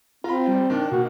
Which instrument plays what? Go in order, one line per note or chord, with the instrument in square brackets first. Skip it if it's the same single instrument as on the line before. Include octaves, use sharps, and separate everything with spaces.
[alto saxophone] C4 [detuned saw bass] F4 [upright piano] A#5 B5
[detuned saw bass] G3
[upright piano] D#3 [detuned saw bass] D4
[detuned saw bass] B2 [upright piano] A#3 [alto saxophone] F#4